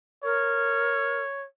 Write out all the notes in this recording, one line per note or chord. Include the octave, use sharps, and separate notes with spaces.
A#4 C#5